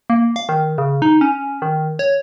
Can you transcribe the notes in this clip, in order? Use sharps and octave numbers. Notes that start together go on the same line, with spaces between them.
A#3
F5
D#3
C#3
D#4
C#4
D#3
C#5